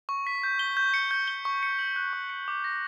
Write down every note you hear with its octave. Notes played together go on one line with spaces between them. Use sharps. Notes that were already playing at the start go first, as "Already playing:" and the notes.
C#6
B6
G6
G7
G6
C#7
G6
G7
C#6
C#7
F#7
F#6
C#6
C#7
D6
A#6